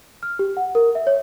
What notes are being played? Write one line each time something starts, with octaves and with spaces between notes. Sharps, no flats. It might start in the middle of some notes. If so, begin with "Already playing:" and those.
F6
G4
F#5
A#4
E5
C#5